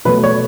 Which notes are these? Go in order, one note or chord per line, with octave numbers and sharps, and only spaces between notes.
B2 F#3 A3 B4
C#5